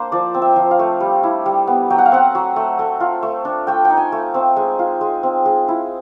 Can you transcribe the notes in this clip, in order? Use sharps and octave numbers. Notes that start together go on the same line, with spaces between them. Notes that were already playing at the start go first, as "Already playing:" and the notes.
Already playing: A#3 D4 C5
F3 D5
C4
E5
F3
F5
A3
G3
E4
G3
B3
F#3 G5
F#5
F5
C4 F#5
F#3
A3
A3
F4
A3
D4
A3 G5
G5
D#4
G#5
A3
C4
G#3
F4
G#3
C4
G#3
E4